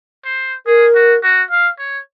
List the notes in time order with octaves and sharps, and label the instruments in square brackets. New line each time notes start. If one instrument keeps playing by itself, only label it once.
[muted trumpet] C5
[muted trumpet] G#4 [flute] A#4
[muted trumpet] F#4
F#4
F5
C#5